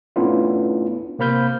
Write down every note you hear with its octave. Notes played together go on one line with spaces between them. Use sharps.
A3 B3 C#4 D4 E4 F4
C3 A#3 C5 B5 F6 G6